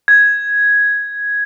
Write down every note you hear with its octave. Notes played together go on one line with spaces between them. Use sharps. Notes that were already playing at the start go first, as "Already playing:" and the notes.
G#6